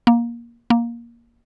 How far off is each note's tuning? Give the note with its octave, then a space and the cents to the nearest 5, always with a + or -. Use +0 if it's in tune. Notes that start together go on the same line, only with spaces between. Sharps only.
A#3 +15
A#3 +10